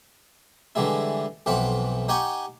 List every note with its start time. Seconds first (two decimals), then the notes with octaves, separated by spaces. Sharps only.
0.75 D3 E3 G3 G#3 E4
1.46 B1 F2 E3 C4 F#5 B5
2.08 D#4 G4 F#5 G#5 C#6